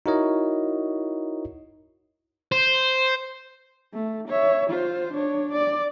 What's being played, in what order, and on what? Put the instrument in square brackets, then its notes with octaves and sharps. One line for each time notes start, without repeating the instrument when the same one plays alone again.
[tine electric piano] D#4 E4 F#4 A#4 C#5 D#5
[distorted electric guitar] C5
[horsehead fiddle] A3
C#5 E5
F4 C5
D4 C#5
D5